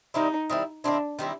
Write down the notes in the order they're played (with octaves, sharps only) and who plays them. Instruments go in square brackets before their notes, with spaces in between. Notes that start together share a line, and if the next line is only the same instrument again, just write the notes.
[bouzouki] D#3 G3 C4 E4 [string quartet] D#4
[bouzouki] D#3 G3 C4 E4
[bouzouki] D#3 G3 C4 E4 [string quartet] D4
[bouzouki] D#3 G3 C4 E4